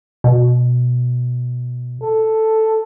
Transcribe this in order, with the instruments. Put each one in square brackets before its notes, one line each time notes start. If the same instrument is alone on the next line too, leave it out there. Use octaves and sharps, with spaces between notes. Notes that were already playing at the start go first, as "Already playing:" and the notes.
[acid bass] B2
[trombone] A4